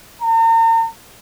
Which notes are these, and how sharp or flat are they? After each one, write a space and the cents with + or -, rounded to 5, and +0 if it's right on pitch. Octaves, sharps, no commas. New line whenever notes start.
A#5 -40